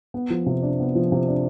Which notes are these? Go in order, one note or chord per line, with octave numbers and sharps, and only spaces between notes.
B3
F3
C3
D4
B3
F3
C3
D4